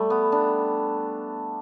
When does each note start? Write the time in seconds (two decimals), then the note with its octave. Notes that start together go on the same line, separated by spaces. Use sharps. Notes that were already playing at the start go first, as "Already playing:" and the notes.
Already playing: G3 A3
0.10 B3
0.32 D4